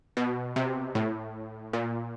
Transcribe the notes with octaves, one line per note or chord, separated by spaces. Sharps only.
B2
C3
A2
A#2